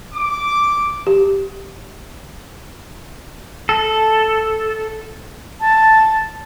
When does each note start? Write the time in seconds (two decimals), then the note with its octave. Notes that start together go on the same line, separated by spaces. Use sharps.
0.14 D6
1.07 G4
3.69 A4
5.59 A5